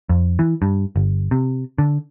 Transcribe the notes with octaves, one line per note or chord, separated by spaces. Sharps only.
F2
E3
G2
G1
C3
D3